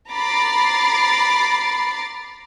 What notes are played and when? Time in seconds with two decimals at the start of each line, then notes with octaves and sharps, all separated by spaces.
0.10 A#5 B5 D6 A6 C7